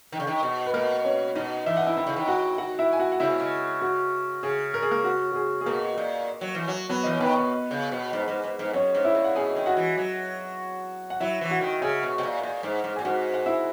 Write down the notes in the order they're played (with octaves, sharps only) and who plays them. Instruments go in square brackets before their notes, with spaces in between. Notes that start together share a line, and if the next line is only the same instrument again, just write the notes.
[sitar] D#3
C#3
D#3
B2
[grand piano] B4
[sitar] B2 [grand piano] A#3 A#4
[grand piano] C#4 C#5
[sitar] B2 [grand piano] D#4 D#5
[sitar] E3 [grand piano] E5
[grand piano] F#5
E4 E5
[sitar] D#3 [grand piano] E4 E5
[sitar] C#3
D#3
[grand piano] F#4 F#5
F#4 F#5
E4 E5
G#5
F#4 F#5
F#5
[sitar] C#3 [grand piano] E4 E5
[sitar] B2
C#3
[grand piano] F#4
[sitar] C#3 [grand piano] G#4
[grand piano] A#4
G#4
A#3 A#4
F#4
F#4
G#4
G#4
[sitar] B2 [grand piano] A#3 A#4
[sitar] A#2
F#3
E3
F#3
[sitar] F#3 [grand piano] B3 B4
[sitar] E3 [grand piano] D#5
[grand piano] C#5
[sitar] D#3 [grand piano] B3 B4
[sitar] B2
C#3
B2
G#2
G#2
G#2
G#2
[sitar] F#2 [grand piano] C#4 C#5
[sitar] G#2
[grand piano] E4 E5
[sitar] A#2
[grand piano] F#5
[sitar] B2 [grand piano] G#4 G#5
[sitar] D#3
[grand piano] F#4 F#5
[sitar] E3
F#3
[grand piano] F#5
[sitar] F#3 [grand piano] E4 E5
[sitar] E3
[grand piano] F#4 F#5
[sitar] D#3
[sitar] C#3 [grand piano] G#4 G#5
[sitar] B2
B2
A#2
A#2
G#2
G#2
[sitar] A#2 [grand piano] G#5
[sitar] G#2 [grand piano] F#4 F#5
[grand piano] F#5
E4 E5